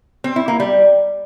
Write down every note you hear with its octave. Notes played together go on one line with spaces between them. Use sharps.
C4
E4
A#3
G3